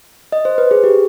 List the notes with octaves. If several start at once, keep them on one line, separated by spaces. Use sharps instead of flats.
D#5
C5
B4
G#4
G4